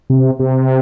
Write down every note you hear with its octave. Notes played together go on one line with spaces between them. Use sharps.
C3
C3